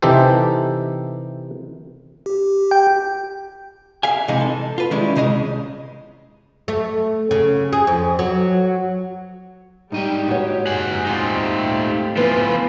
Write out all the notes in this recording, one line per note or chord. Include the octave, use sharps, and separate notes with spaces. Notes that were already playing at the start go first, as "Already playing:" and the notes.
C3 E3 D#4 G4 A4 C5
G4
G5
G#4 E5 F5 G#5
C3 E3 G#3 D#4
A4
F4 B4
D#3 G3 G#3 C#4 E4
C2 C#3 G#3 D#5 A#5
A3
C#3
G#4
F2
F#3
G#2 G3 D#4 G4 D#5 G5
F#4 G4 C#5
G#4 F#5
A3 C4 D#4 F4 G4
E3 B3 F4 B4